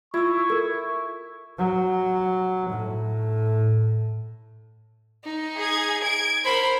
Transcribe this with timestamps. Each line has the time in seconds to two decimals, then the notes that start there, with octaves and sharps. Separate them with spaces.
0.14 E4 F4 C#6 E6
0.50 A4 A#4
1.58 F#3
2.70 A2
5.24 D#4
5.57 G#4 G#6
6.01 G#6 D7
6.45 A#4 C5 B5